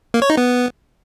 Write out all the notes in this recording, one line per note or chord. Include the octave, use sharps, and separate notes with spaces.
A#3
C#5
D#4
B3